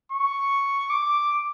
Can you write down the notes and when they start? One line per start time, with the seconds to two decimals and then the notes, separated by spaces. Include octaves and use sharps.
0.12 C#6
0.90 D6